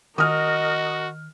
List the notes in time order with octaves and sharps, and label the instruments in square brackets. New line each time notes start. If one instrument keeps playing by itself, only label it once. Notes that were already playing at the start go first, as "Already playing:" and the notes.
[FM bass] D#3 [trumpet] F#4 [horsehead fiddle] A#4 D#5 [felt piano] D#6 F6